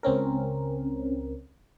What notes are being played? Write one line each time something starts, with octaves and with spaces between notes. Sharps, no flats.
C#2 C4 C#4 A#4